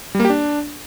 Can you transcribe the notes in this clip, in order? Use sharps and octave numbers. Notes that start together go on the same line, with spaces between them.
G3
A#3
G4
D4